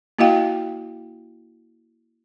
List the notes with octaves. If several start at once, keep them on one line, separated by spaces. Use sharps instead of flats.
A#3 E4 F#4 D#5 F5 G5